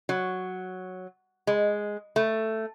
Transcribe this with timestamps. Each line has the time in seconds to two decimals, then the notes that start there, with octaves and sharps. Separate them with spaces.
0.09 F#3
1.47 G#3
2.16 A3